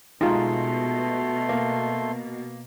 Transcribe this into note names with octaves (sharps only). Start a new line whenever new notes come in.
B2 G#3 A3 D#4 F4 C6
A#3